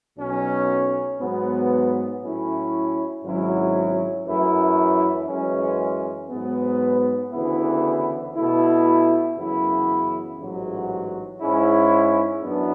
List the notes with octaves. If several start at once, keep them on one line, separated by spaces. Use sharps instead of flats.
B1 B2 F#3 C#4
G#2 F#3 B3
A2 F#3 C#4 E4
G#1 G#2 F#3 C#4 E4
F#2 E3 A3 E4
F#2 E3 G#3 C#4
G#2 F#3 B3
D2 C#3 E3 B3 E4
B2 A3 E4
F#2 C#3 E3 B3 E4
A1 G#2 F#3
G#2 G#3 C#4 E4
F#2 E3 B3 D4